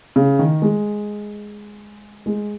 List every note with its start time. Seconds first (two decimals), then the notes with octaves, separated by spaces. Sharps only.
0.16 C#3
0.39 D#3
0.62 G#3
2.26 G#3